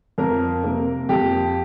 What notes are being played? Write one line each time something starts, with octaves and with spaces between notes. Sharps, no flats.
F2 A#4
C3 A#3
F2 G4